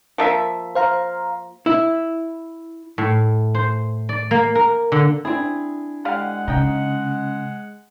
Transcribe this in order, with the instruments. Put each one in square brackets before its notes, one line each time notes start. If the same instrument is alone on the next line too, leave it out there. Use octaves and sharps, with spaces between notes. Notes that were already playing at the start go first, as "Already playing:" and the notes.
[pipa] F3 A#3 E5
[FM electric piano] C5 F5 A#5
[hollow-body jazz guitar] E4
[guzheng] A2
C5
D5
A#3
A#4
D3
[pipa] C4 G#4 [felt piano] D4 E4
[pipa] D3 G4 F5 [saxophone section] G#3 F#5
[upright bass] C#3 [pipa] D#4 D#5 G5